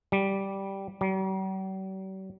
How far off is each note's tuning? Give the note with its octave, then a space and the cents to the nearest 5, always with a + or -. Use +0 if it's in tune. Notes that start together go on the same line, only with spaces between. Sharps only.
G3 -5
G3 -45